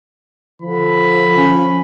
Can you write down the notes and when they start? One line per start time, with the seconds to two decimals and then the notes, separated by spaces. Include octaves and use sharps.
0.62 D3 F3 B5
1.37 C#4